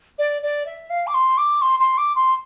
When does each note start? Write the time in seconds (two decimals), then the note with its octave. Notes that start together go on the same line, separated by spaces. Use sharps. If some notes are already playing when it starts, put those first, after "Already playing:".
0.19 D5
0.42 D5
0.66 E5
0.90 F5
1.07 D6
1.14 C6
1.38 D6
1.62 C6
1.80 C6
1.98 D6
2.15 C6